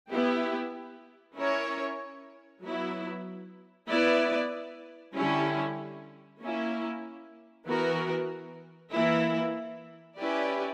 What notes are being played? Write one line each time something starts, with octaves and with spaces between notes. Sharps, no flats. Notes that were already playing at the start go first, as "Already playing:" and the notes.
B3 E4 G4
C#4 E4 A#4 C#5
F#3 B3 E4
B3 E4 B4 D5
D3 G3 C#4 E4
A#3 C#4 E4
E3 B3 F#4 A#4
E3 A#3 E4
C#4 E4 G4 B4 D5